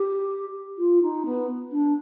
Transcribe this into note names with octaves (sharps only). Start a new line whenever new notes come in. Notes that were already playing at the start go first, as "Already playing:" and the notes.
Already playing: G4
F4
D#4
B3
D4